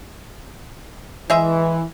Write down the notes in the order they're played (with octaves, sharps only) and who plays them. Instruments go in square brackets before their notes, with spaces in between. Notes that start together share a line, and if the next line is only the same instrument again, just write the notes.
[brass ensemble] E3 [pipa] G#3 E5